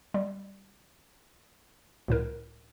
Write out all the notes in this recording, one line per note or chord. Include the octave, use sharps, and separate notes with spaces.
G3
C#2 A2 A#4